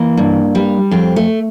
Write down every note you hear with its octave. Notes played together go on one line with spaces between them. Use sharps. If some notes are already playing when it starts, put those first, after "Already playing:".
Already playing: E3 A#3
G2
G3
F2 C4
A3